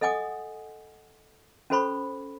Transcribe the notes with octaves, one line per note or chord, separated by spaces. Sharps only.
A4 D#5 F#5 G#5 D6 D#6
C#4 F#4 A4 C5 B5 C#6